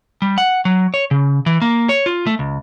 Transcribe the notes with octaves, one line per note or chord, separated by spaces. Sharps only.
G3
F#5
F#3
C#5
C#3
E3
A#3
C#5
F4
A3
C#2